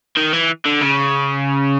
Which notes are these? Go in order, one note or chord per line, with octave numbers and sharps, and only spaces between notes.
D#3
E3
D3
C#3